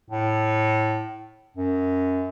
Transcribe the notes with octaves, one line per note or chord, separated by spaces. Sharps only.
A2
F#2